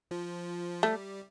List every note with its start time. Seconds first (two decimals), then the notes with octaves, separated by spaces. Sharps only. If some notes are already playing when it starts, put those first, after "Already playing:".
0.11 F3 F4
0.83 G3 A3 G4